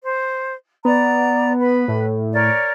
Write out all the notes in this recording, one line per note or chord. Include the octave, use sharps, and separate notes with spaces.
C5
B3 D5 A#5
B4
A2
A#4 C#5 D5